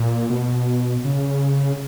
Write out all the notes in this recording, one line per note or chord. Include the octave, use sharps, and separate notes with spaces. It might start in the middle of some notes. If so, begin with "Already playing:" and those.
Already playing: A#2
B2
C#3